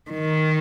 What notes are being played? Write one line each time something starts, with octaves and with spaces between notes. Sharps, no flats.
D#3